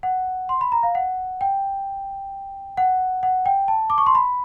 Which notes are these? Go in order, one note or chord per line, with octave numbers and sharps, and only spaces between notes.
F#5
C6
B5
A#5
F5
F#5
G5
F#5
F#5
G5
A5
D6
C#6
C6
B5